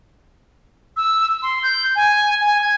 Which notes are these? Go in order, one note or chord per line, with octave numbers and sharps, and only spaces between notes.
E6
C6
G6
G#5
G#5
G#6